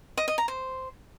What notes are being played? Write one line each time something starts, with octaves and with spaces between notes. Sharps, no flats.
D#5
D#5
A#5
C5